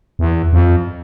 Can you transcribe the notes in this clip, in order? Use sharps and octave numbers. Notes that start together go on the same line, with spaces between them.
E2
F2